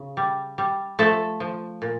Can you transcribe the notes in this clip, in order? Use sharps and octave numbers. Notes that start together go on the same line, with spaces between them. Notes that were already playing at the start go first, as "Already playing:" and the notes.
Already playing: C#3
G3
G3
F3 A3 A4
F3
A#2